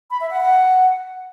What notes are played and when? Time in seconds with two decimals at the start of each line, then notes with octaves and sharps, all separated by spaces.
0.11 B5
0.21 E5
0.31 F#5
0.41 F#5